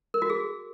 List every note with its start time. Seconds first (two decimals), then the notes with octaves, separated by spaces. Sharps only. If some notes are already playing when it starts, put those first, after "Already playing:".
0.14 A#4
0.22 F#4
0.30 G#4